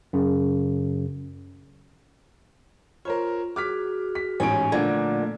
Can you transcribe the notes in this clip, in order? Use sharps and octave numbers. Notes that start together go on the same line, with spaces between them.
F#2 C#3
F4 A#4 C5 C#5
F#4 G#4 D6 F6 B6
B6
A1 G#2 C#4 D7
A#2 D3 F3 A3 A#3 D4 G#6